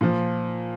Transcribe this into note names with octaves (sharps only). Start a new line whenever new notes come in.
A#2 F3